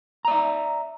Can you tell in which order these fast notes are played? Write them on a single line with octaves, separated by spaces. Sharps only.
A#5 D5 E5